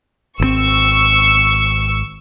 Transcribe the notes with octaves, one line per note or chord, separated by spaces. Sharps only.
G#1 C#3 C4 C#6 E6